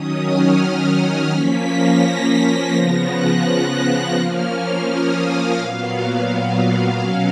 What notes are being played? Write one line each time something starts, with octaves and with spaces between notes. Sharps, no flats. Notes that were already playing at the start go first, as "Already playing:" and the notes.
Already playing: D#3 F#3 C#4 D#6
F6
F3 A#3 C#4 B6
A#6
A#6
C#3 F3 B3
F#6
F#6
F3 A#3 C#4 F6
F6
D#6
F5
A#2 F#3 B3
F5
B2 F#3 C#4 F5